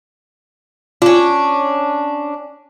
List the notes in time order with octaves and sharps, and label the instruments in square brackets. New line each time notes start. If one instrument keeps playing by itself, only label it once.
[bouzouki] C#4 D4 [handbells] F4